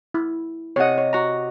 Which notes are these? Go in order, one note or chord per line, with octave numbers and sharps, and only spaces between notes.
E4
C3 C#5 D#5 F#5
C#5
F#4 A#5